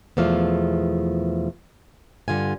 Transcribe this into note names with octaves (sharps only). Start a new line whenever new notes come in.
E2 B2 F3 A3 F5
G2 D3 F4 G#5